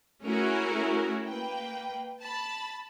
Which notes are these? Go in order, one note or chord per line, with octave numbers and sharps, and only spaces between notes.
A3 C#4 E4 F#4 G#4 A#4
A#3 B4 G5
A5 B5 A6